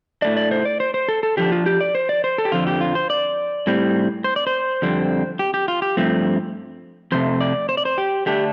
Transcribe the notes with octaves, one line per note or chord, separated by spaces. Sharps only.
A2 A3 D4 D5
D5
C5
D5
C5
C5
A4
A4
D3 F3 D4 G4
F4
G4
D5
C5
D5
C5
A4
G4
F2 D3 F3 F4
G4
F4
C5
D5
A2 G3 C4
C5
D5
C5
F2 D3 G3 C4
G4
G4
F4
G4
G2 F3 A3 C4
F2 C3 A3 C5
D5
C5
D5
C5
G4
D3 A3 D4 G4